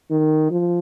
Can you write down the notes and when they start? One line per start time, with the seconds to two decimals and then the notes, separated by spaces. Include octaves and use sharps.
0.10 D#3
0.51 F3